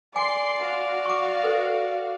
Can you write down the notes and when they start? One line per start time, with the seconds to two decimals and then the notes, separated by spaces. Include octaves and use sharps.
0.16 D5 G#5 C6 D6 C7
0.59 F#4 F5
1.06 C#6 D6
1.43 A4 B4 C5